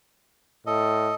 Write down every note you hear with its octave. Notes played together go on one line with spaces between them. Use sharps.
A2 A4 D#5